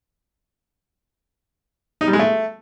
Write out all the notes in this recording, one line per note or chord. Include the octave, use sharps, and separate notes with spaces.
D#4
G3
G#3
A3